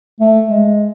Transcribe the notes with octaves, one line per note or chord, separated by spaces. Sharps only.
A3
G#3